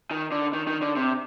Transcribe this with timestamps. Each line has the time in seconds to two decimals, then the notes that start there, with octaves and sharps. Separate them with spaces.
0.11 D#3
0.32 D3
0.53 D#3
0.67 D#3
0.82 D3
0.96 C3